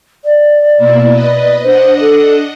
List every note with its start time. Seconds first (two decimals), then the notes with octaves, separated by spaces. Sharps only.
0.25 D5
0.77 B2 A#3 E4
1.09 B4 D#5
1.63 D4 C5 D#5 F#5
2.00 A4